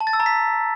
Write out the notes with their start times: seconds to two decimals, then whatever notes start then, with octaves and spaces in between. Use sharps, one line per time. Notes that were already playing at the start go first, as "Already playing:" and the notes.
0.01 A5
0.07 A6
0.13 E6
0.20 A#5
0.26 B6